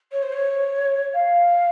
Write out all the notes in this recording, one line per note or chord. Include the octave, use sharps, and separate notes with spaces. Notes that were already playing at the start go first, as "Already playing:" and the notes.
C#5
C5
C#5
F5